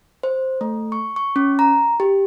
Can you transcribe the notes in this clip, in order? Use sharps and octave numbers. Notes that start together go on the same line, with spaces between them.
C5
A3
C#6
C#6
C#4
A#5
G4